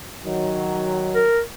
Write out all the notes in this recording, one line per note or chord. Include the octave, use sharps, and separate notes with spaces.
D#3 F#3
A#4